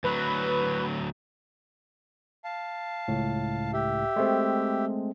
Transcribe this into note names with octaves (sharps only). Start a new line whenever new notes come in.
D2 F#3 B4
F5 A5
C#2 A2
G4 E5
G#3 A3 C4